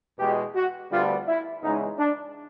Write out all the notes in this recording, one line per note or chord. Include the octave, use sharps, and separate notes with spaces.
E2 B2 G#3 G4
F#4
D2 D3 G3 B3 F4
E4
E2 C#3 E3 G#3 D#4
D4